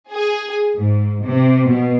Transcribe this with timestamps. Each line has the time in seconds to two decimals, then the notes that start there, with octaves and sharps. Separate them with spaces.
0.13 G#4
0.77 G#2
1.24 C3
1.67 B2